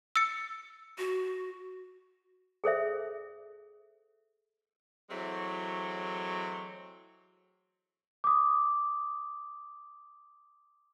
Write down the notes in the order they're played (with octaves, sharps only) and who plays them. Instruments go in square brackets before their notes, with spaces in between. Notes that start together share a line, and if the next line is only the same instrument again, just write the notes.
[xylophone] E6 A6 C#7
[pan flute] F#4
[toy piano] G#4 A4 C5 E5
[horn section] E3 F#3 G#3 A3 C4
[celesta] D6 D#6